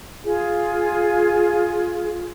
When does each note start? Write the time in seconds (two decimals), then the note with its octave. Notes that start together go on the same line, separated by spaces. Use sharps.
0.23 F4 G#4